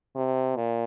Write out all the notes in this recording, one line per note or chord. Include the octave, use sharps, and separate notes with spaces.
C3
A#2